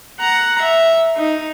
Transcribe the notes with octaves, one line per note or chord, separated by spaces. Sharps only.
F#5 A#5
E5
D#4